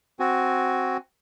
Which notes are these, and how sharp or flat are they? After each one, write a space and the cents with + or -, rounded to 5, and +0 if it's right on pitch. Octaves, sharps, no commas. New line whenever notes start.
C4 +0 F#4 +5 G#5 +10